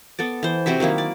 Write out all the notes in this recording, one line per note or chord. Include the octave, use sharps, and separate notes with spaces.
B3 A4 D5
E3 C5
C3 C4 F#4 E5
D#3 F#3 A#3 E4
D5